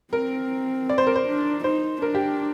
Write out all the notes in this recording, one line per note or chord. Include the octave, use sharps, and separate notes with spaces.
C4 A#4
D5
C5
A#4
C5
D4
D#4 C5
D4 A#4
G4